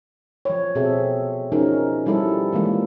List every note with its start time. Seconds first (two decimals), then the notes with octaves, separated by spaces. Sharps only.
0.45 F3 C#5
0.75 B2 C4 G#4 A4 E5
1.52 F3 C#4 D#4 F#4 G#4 A#4
2.06 F3 G3 E4 A4
2.53 E3 F3 G#3 A#3